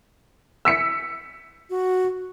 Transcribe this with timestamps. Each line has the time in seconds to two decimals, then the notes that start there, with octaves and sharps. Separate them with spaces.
0.65 E6 B6 C#7
1.70 F#4